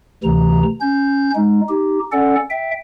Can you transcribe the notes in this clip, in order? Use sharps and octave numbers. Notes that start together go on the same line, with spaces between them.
D2 C3 E3 A#5
C#4 G6
G#3 D#4
D#4 G4
C#4 A4 D5 F#5
E5 G5